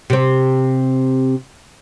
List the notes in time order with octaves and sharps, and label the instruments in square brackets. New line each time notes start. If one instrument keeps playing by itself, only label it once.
[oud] C3 C4